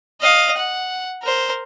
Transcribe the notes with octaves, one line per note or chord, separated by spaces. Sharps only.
D#5 F5
F#5
A#4 C5